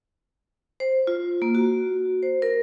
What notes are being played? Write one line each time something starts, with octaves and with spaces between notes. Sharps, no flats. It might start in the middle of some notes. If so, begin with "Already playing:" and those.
C5
F4
A#3
F#4
C5
A#4